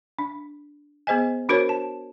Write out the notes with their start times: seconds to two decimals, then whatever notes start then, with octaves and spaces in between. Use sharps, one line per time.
0.19 D4
1.07 B3 G#4 C5 D#5 G#5
1.49 D4 F#4 A#4 C5 C#5
1.69 A5